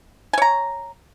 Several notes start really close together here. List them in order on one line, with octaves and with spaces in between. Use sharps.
G#5 C#5 A#5